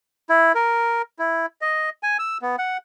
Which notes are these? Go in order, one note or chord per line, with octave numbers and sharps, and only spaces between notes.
E4
A#4
E4
D#5
G#5
E6
B3
F#5